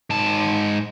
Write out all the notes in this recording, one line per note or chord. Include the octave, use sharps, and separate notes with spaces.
G#2 A5